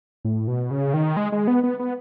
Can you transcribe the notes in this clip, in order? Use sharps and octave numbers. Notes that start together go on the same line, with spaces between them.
A2
B2
C#3
D#3
G#3
G#3
B3
B3
B3